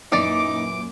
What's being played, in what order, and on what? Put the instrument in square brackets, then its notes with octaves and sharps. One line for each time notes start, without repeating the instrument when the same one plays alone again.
[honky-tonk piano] F#2 A#2 [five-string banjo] E3 D5 [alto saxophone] D#4 [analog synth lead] D6